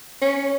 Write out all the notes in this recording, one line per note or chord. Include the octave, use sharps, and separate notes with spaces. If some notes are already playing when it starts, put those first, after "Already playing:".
C#4